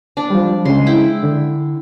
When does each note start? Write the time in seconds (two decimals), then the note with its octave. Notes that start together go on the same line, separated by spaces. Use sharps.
0.17 D4
0.30 F3 G3
0.65 C#3 G#3 C6
0.87 E4 G5
1.23 D3